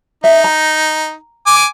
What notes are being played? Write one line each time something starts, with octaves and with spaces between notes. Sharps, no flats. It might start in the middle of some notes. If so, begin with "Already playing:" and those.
D#4 E5
A#5
G#5 D6